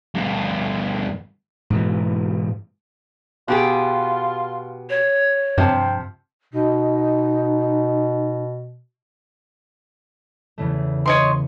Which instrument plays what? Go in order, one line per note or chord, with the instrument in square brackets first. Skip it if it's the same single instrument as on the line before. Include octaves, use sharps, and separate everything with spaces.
[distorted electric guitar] D2 G2
[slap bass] G#2 B2 E3
[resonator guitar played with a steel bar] B2 G4 G#4 [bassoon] F4
[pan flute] C#5
[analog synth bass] G2 [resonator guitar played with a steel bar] C3 F3 [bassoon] C4
[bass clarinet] B2 [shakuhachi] D#4
[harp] E2 C#3 A3
[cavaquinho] C#5 D#5 C6